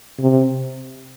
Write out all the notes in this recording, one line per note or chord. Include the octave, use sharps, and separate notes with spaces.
C3